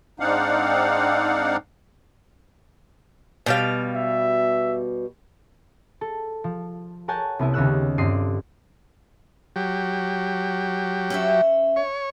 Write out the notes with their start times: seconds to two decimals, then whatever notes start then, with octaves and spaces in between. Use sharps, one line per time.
0.20 G#2 C4 D4 D#4 F5 F#5
3.46 B2 G3 F5
3.96 E5
6.01 A4
6.44 F3
7.08 A#4 C#5 F#5 G#5 A5 G6
7.39 C2 B3 E4
7.54 D#2 C#3 B3 C#5 E6 F#6
7.98 G1 G2 C4 D5 D#6 C7
9.56 F#3 G4
11.10 C#4 C5 E5
11.76 C#5